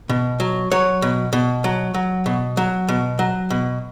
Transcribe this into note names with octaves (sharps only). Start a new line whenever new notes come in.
B2
F#3
F#3 C#5
B2
B2
F#3
F#3
B2
F#3
B2
F#3
B2